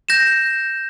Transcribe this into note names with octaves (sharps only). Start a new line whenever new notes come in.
G6 A#6 E7